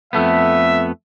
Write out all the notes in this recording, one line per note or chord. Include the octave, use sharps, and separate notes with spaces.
F2 A3 B3 E5